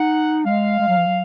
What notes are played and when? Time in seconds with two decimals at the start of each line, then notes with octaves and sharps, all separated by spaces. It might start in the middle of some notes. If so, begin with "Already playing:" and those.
Already playing: D#4 F#5
0.45 G#3 F5
0.80 G#3
0.88 F#3
0.97 F3
1.06 F#3